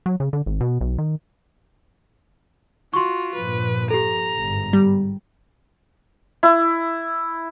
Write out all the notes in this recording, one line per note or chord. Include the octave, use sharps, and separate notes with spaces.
F#3
C#3
D3
G#1
B2
B1
D#3
F4 F#4 C6 C#6
G2 A#2 F3 B4
G4 A4 A#5
G1 G#2
G3
E4